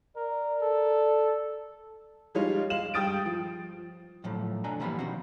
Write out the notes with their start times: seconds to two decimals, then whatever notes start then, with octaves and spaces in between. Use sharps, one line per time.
0.16 A#4 D5
0.62 A4
2.35 F3 G3 G#3 D#4 C#5 F5
2.70 G#3 F5 E7 F#7
2.94 G2 G5 D#6 A6 D7
3.26 F3
4.24 A2 F3 F#3 A3
4.64 D2 B2 D3 D4 G#5 A#5
4.80 E3 G3 A#3 B3 G4 B5
4.99 B2 D#3 F3 C4 F#4